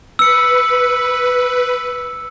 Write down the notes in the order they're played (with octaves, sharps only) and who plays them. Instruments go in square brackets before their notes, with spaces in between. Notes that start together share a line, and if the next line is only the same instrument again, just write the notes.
[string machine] B4 [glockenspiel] E6 C#7